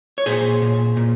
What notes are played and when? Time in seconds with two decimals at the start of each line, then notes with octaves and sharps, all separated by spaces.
0.18 C#5
0.26 A#2 G#4 C5
0.62 A#2
0.97 A#2